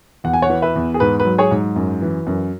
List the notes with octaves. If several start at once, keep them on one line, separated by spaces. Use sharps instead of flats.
E2 F#5
G#5
C#5 F#5
E3
B4 E5
E2
G#4
G#2 B4
B4
F#3
G#4 C#5
G#2
F#2
E3
F#2